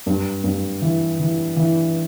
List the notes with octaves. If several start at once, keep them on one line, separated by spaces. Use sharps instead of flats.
G2
G2
E3
E3
E3